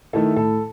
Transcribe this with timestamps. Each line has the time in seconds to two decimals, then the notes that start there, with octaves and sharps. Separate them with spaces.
0.13 D#3 A3 E4 A4
0.36 A2 A4